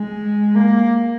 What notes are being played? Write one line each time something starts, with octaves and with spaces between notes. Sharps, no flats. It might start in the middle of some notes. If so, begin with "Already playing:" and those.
Already playing: G#3
A#3